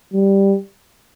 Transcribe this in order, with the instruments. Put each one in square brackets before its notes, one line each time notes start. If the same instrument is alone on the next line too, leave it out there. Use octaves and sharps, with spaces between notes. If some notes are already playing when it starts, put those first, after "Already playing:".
[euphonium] G3